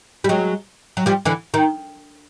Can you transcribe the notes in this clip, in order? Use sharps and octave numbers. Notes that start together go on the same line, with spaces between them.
G3
F#3 G#3
F#3
F3 G3
D3 E3
D#3